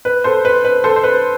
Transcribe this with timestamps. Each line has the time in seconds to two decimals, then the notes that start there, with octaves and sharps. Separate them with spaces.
0.05 B4
0.24 A4 C5
0.45 B4
0.65 B4
0.84 A4 C5
0.96 C5
1.04 B4